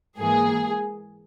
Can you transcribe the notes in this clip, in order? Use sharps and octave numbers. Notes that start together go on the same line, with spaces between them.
G#2 E3 A#3 G#4